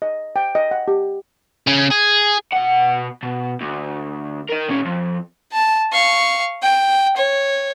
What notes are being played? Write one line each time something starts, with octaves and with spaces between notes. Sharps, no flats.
D#5
G5
D#5
F#5
G4
C#3 C#4
G#4
B2 F#5
B2
D2
A#4 D#5
A#2 C#4
F2
A5
F5 C#6
G5
C#5